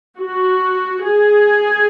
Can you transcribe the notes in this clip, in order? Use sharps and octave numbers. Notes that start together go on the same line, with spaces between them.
F#4
G#4